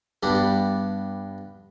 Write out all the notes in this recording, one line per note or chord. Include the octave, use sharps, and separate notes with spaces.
G2 G3 B3 D4